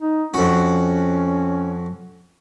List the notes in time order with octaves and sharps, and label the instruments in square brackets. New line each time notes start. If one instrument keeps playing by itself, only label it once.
[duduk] D#4
[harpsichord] F2 F#4 [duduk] C#4